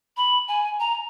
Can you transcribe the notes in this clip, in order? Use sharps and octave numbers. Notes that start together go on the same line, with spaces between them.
B5
G#5
A#5